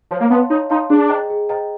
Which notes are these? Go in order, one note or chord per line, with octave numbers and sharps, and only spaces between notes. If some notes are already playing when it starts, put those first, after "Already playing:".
F3 C#5
A#3
B3 F5 A5 C6
D#4 C#5
D#4 F5 A5 C6
D4 G#4
C5 D#5 G5 A#5
G#4
C5 D#5 G5 A#5